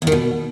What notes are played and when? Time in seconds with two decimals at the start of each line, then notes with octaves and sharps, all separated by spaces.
0.02 E2
0.07 D#3
0.12 B2